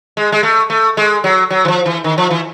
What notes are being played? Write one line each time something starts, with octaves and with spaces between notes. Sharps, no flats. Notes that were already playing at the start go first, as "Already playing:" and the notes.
G#3
G#3
A3
A3
G#3
F#3
F#3
E3
F3
E3
D#3
F3
E3